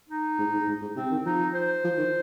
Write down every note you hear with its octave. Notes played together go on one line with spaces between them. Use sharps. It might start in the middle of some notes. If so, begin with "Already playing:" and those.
D#4
G#2
G#2
G#2
G#2
C3 C4
D#3
F3 D#4
C5
F3
D#3